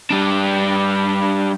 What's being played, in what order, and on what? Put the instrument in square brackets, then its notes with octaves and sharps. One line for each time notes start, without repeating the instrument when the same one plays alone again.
[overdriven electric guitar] G3 D4